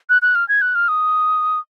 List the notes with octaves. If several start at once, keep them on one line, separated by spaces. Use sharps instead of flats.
F#6
F#6
F6
G#6
F#6
F6
D#6